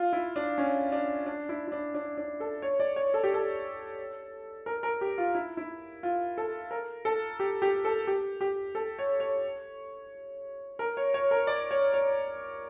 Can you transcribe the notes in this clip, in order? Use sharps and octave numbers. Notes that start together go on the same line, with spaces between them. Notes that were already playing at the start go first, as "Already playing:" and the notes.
Already playing: F4
E4
D4
C#4
D4
D4
E4
E4
D4
D4
D4
A4
C#5
D5
C#5
A4
G4
A4
A#4
A#4
G4
F4
E4
E4
F4
A4
A#4
A4
G4
G4
A4
G4
G4
A4
C#5
C#5
A#4
C#5
C#5
A#4
D5
C#5
C#5